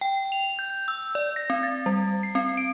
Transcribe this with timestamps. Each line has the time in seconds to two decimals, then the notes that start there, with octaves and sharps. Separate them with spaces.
0.01 G5
0.32 F7
0.59 G6
0.88 E6
1.15 D5
1.36 A#6
1.50 C4
1.63 A6
1.86 G3
2.23 C7
2.35 C4
2.57 D7